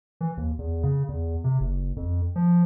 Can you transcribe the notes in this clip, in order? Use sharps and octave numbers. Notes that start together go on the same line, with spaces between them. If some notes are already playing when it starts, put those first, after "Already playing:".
E3
D#2
E2
C#3
E2
C3
F#1
F2
F3